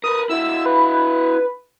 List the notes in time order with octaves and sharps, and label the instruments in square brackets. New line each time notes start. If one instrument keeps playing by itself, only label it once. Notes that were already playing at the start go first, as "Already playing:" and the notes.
[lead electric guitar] A#4 B4 [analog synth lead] D#6
[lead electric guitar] E4 F#4 [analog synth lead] E6
[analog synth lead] B4